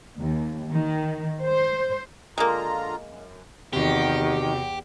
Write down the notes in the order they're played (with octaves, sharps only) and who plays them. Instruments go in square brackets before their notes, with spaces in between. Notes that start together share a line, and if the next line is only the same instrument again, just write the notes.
[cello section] D#2
D#3
C5
[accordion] D3 F4 A#5 [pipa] G#3 A#3
[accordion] F#2
[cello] E2 [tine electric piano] C3 F#4 [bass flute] D#3 [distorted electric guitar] G4